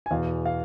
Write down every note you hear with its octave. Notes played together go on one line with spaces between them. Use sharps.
G#5
E2 B2 F5
F5